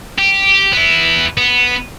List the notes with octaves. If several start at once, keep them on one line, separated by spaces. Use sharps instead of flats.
G4
B3 E4
B3